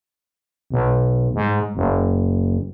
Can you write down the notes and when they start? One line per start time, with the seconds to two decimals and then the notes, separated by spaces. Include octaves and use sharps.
0.70 B1
1.34 G#2
1.75 F#1